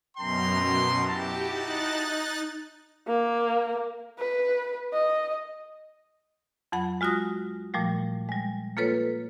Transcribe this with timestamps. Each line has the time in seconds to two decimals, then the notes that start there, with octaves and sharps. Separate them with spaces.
0.18 F#2 B2 G5 A#5 C6
1.08 E4 F#4 G4 A5
1.49 D#4 F#6 A6
3.08 A#3
4.19 B4
4.93 D#5
6.72 F2 F#3 F#5 B5
7.01 G#3 F4 F#4 D#6 A#6
7.74 A#2 F3 G3 A3
8.29 G3 G#3
8.77 A#3 F4 A4 B4 C#5